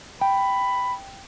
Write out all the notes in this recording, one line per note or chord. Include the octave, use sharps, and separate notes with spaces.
G5 B5